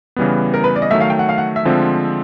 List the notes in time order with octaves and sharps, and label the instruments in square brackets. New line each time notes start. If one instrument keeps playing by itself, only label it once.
[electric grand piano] C#3 E3 G3 B3
[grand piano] A#4
B4
D5
D#5
[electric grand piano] D#3 F#3 A3 [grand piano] E5
[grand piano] F5
G5
F#5
F5
F#5
E5
[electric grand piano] D3 F3 G#3 C4 F4